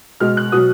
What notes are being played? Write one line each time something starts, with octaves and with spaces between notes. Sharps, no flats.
B2 G#3 F6
F#6
B2 F#3 D#6